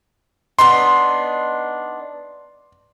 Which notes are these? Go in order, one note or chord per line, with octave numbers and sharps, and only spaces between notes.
B3 D4 D#4 C6